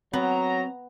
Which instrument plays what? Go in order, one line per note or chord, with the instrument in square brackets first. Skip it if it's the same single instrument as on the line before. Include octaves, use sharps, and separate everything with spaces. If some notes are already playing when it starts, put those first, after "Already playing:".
[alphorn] F#3 [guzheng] B3 [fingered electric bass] C4 [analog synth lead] A#5